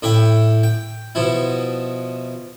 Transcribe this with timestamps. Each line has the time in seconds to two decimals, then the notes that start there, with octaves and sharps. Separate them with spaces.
0.02 A2 E4 E5 G5
0.63 G5
1.15 B2 F3 E4